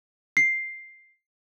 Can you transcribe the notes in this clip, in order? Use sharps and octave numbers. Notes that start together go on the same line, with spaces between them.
C7